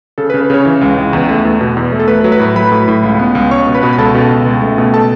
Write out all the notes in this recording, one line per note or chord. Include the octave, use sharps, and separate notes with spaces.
C#3 A4
B4
C#3
B4
C#3 C#4 C#5
E3
C#2
C#2
E2
A3
E2
B2
E2
A3
A4
A3 B4
B4
F#3
B4
A2
F#3 B4 B5
A2
A2
C#2
B3
C#2
C#2 C#5 C#6
B2
B4 B5
B2
B5
C#2 A4 A5
B2
C#2
C#2
A3
B2
A4 A5